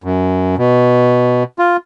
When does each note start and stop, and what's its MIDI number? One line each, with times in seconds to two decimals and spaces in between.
0.04 0.55 42
0.58 1.43 47
1.59 1.77 65